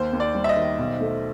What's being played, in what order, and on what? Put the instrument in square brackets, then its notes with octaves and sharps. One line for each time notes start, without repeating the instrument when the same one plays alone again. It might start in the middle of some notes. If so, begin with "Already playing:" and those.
Already playing: [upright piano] D#2 [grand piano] C5
[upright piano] D#2
[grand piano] D5
[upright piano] G3
[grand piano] E5
D#5
[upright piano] D#3
B1
A3